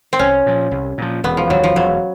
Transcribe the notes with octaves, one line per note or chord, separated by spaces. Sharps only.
C4
C2 C#4
A#2 F3
C2
A#2 F3
E1 B3
F3
D#2 D#3 F#3 G3
F3
E1 F#3